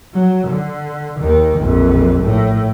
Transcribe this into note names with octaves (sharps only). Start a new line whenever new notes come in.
F#3
D3
D#2 D#3
A#1 F2
A2